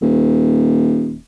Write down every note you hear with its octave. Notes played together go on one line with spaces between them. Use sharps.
D#1